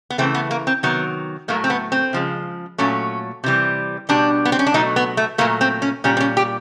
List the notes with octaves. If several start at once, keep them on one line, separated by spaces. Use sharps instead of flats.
B3
C#3 E3 A3 C4
B3
A#3
C4
C3 D#3 F#3 B3
A2 F#3 A3 A#3
C4
B3
C4
C#3 F3 G#3
A#2 F#3 A3 C#4
C3 E3 G3
B2 G3 D4
B3
C4
C#4
D4
B2 F#3 A3 D#4
B3
A3
A#2 F#3 A3 A#3
C4
C#4
A#2 G3 C#4
C4
C#4
G4